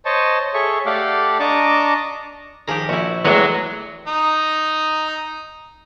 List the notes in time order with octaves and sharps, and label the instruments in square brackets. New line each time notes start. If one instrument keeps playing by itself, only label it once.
[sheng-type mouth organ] C5 C#5 D#5 A5 C#6
G#4 A4 C#5 E5 C#6
A3 G4 A4 D5 F5 F#5
D4 D#5 A5 A#5 C#6 D6
[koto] D#3 F3 G4 [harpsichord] G#4 A#5
[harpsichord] A#1 [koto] E4 F#4
[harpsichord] E2 A2 [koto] E3 G#3 B3 [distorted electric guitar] F#3
[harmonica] D#4 D#6